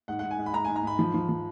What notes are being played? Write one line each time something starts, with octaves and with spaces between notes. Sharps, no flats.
G#2 F#5
G#2 F#5
G#5
G#2
B5
G#2 A#5
G#2 G#5
A#5
G#2 B5
F3
F3
F3